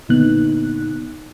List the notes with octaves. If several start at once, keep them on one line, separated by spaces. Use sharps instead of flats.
A#2 D3 B3 D#4 F#6